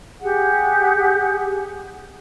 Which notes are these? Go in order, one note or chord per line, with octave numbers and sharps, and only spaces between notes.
G4 G#4 F#5